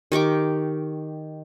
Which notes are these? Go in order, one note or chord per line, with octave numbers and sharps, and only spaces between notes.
D#3 G4 C#6 D6